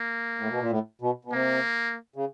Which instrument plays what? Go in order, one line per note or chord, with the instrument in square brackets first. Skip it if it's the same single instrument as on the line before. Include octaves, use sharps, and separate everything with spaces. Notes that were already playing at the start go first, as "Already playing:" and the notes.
Already playing: [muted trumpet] A#3
[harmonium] A2
B2
A#2
A2
B2
B2
[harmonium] C3 [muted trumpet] A#3
[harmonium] C#3